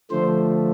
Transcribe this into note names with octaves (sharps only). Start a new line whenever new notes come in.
D3 F3 A3 C5